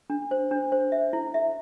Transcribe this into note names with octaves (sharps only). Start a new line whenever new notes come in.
D4
C5
D4
C5
E5
E4
E5